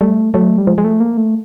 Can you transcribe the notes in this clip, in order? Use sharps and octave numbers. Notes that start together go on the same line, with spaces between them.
G3 A3
F#3 A3
G3
F3 G#3
G#3
A3
A#3
A3